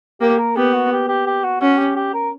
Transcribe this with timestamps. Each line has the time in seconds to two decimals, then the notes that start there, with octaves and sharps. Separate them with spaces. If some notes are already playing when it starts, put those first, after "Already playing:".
0.21 A#3 G4
0.39 A#4
0.56 B3 G4
0.74 F#4
0.92 G4
1.08 G4
1.26 G4
1.44 F#4
1.61 C#4 F#4
1.78 G4
1.96 G4
2.14 A#4